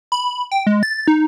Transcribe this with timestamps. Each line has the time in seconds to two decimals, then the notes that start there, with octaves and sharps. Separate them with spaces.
0.12 B5
0.52 G5
0.67 G#3
0.83 A6
1.08 D#4